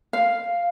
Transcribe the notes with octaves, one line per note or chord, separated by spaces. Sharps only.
F5